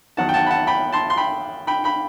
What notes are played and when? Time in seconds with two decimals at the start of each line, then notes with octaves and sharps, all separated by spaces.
0.17 E2 D#3 F#3 F#5 A5
0.29 G5
0.34 F#5 A5
0.46 B5
0.50 F#5 A5
0.67 G5 B5
0.92 A5 C6
1.10 C6
1.17 G5 B5
1.67 G5 B5
1.84 G5 B5